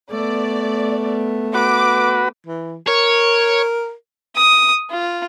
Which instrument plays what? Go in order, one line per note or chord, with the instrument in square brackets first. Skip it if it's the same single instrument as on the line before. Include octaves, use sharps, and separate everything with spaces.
[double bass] A3 B3 [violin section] D5
[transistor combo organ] F#4 B4 [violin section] D6
[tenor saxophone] E3
[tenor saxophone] A#4 [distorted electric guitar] C#5
[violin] D#6
F4